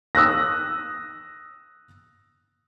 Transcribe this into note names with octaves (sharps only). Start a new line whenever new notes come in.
D#6 E6 F#6 A#6